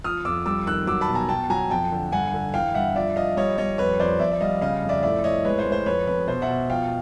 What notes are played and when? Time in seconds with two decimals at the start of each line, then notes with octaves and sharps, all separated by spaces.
0.04 F3 D#6 F6
0.25 F2 D6 E6
0.46 G3 D6 E6
0.67 D#3 E6 F#6
0.87 F#3 D6 E6
1.01 A5 B5
1.08 B2
1.15 G#5 A#5
1.29 B2 G5 A5
1.50 F#3 G#5 A#5
1.70 F2 G5 A5
1.92 D3
2.12 G2 F#5 G#5
2.34 D3
2.54 E3 F5 G5
2.74 G2 E5 F#5
2.95 F3 D5 E5
3.16 F3 D#5 F5
3.37 G3 C#5 D#5
3.58 G3 C#5 D#5
3.78 F2 B4 C#5
4.00 F2 C5 D5
4.20 F2 D5 E5
4.32 E5
4.41 G3 D#5 F5
4.62 C#3 D#5 F5
4.83 F2
4.89 D5 E5
5.03 A2 D5 E5
5.24 A2 C#5 D#5
5.45 G#3 B4 C#5
5.59 C5
5.66 G#3
5.72 C5
5.86 F2 B4 C#5
6.07 F2 B4
6.27 B2 C5
6.42 E5 F#5
6.49 B2
6.70 F3 F5 G5